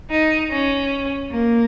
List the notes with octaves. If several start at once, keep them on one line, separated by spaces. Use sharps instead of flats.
D#4
C#4
A#3